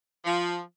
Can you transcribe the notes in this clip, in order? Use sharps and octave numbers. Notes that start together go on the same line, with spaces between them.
F3